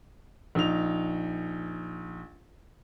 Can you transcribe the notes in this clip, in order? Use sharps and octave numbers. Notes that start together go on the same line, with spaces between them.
A#1 D#4 F7